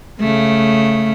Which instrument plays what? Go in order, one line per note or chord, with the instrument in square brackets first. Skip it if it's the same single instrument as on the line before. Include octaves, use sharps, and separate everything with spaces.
[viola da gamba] C#3 A3